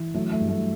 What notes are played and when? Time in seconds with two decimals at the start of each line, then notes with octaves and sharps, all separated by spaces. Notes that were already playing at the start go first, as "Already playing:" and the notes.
Already playing: E3
0.14 F#3 A3
0.32 A3
0.40 G2
0.49 A3